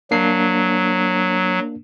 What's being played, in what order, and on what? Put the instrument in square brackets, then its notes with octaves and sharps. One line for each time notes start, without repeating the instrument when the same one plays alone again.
[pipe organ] F#3 [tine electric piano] A#3 D4 C7